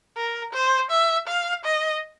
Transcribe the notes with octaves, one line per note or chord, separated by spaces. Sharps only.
A#4
C5
E5
F5
D#5